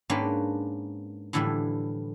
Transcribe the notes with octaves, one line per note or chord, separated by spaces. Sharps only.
G#2 A#3 C#4 D4 B4 G5
A2 D3 E3 F3 G3